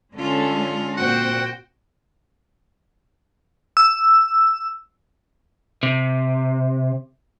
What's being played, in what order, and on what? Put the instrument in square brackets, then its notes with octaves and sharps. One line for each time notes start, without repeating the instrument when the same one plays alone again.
[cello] D3 F4 [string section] G#3 C#4 A4
[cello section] A#2 C4 [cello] F#4 [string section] C5 G5 [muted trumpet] F#5
[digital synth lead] E6
[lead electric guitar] C3